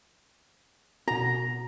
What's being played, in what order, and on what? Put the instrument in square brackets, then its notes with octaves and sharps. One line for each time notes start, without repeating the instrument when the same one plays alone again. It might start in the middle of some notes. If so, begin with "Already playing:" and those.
[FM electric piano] B2 F#4 [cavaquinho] A#5